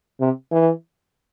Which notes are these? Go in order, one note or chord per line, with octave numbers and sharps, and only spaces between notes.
C3
E3